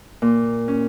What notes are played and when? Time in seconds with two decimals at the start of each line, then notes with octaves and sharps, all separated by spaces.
0.22 A#2
0.68 C#4